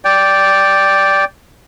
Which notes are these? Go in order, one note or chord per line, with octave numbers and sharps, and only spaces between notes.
D5 G5